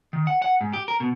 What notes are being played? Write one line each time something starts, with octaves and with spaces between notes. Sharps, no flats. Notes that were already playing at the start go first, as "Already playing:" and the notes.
D#3
F#5
F#5
G#2
G4
A#4
B2